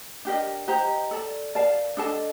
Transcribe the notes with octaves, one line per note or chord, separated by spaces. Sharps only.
D4 G4 A#4 D#5
G4 C5 D#5 A#5
A4 D5 A5
A#4 D5 F5 A5
D4 A4 D#5 A5